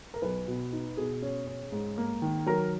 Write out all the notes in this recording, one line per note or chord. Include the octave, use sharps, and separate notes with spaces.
A#4
B1 B4
B2
D#4
B2 G#4
C#4
C#4
G#2
A#3
D#3
F#3 A#4